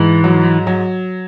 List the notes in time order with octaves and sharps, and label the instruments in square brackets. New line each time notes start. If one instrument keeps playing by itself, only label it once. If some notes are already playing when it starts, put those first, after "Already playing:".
Already playing: [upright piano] G#2 [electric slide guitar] E3
[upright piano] F#3
F#3